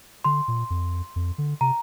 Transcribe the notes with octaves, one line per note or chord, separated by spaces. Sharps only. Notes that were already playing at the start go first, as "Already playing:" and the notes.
D3 C6
A#2
F2
F2
D3
C3 A#5